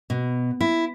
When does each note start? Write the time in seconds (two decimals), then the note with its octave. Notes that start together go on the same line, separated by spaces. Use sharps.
0.10 B2
0.61 E4